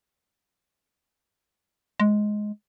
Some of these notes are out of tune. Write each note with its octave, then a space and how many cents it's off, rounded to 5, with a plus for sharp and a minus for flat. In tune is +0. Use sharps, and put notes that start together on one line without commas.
G#3 +10